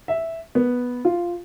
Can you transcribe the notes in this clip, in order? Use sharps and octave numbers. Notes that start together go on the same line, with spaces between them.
E5
B3
F4